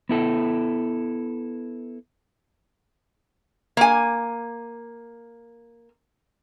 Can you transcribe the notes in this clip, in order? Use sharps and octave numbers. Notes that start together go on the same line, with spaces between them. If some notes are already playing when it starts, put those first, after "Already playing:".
B3 E4 A4
A#3 G#5